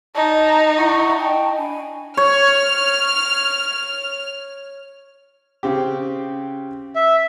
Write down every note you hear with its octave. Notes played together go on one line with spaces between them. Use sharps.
D#4 D#5 A5
E4 F#5 C#6
D#5 G5 A5
D4 G#5 B5
C#5 F6
C#3 C4 G4
E5